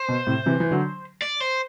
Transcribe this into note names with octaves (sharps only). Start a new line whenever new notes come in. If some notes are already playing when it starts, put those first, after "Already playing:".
Already playing: C5
B2
A2 C3
C3 E3
E3
D3 F#3
D5
C5